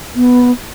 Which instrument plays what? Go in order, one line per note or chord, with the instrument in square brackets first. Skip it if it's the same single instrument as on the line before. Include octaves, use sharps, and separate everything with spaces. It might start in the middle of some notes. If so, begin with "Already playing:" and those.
[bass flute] B3